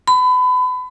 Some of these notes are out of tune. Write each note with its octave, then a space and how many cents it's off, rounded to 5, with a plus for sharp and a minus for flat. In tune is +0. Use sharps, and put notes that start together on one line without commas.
B5 +30